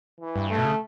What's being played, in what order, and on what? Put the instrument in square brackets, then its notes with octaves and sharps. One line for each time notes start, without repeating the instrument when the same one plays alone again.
[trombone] E3
[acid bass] G2
[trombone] A3
[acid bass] B2
C#3